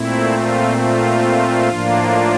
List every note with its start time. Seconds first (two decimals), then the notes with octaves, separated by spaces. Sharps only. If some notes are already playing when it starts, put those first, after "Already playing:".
Already playing: A#2 A3 C4 E4
0.32 F4
0.78 F4
1.69 A2 F3 A#3 D4